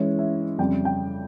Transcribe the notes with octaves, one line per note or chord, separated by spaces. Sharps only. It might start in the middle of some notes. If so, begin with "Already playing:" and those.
Already playing: E3 G#3 C#4 E4 C#5
E5
F2 C#3 G3 G5
G5